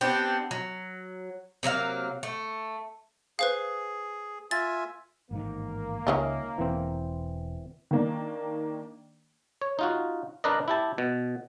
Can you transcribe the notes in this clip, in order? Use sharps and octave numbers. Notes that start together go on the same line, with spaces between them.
B3 C4 D4 G4
F#3
C3 F#3 A#3 F5
A3
G#4 B4 C5 F5
F4 E5 G#5 A6
A1 G#2 D#3 A#3
C#2 D#3 C#4 F4 E5
E1 E3 C4
D#3 A#3 D4
C#5
D#4 F4 F#4
D4 A#4 B4 D5 D#5
E4 G4 A5
B2